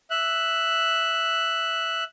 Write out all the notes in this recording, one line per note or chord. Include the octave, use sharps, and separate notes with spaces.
E5 F#6